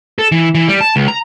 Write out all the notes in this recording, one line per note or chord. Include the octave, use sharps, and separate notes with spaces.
A4
E3
E3
G3
A5
C#2
A#5